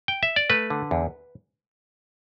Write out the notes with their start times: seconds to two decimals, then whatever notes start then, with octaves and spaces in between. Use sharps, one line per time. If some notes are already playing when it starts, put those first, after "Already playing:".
0.08 G5
0.23 E5
0.36 D5
0.50 A3 B4
0.70 D3
0.91 E2